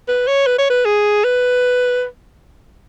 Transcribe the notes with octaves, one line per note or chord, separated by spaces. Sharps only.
B4
C#5
B4
C#5
B4
G#4
B4